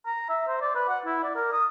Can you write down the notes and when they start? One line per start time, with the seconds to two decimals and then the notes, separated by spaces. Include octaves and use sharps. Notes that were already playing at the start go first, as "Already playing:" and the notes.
0.06 A#5
0.30 E5
0.48 C5
0.61 D5
0.75 B4
0.88 F#5
1.05 E4
1.23 D5
1.36 A#4
1.52 D#6